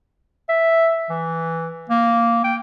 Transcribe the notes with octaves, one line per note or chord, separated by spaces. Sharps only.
E5
E3
A#3
G5